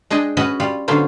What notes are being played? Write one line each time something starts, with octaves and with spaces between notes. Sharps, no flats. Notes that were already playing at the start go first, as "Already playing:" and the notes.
G#3 D4 G#4 D#5 G5
C#4 F#4 B4 D#5 F#5
G3 F4
D3 F#3 B3 C#4 F4 C5